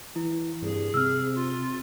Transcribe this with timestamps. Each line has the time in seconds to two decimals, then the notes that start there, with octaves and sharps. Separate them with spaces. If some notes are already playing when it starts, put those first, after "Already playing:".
0.16 E3 E4
0.62 C2 G2 G#4
0.94 C3 C4 E6 F6
1.35 F4